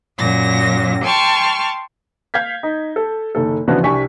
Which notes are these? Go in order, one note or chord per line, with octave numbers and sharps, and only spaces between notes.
F#2 A#2 A#6
G5 A5 C6 C#6 F6
F5 G6 G#6 B6
D#4
A4
F#1 D#3 A4
C#3 E3 F3 B3 D4 F#4
C2 C3 D4 G#5 C#6 B6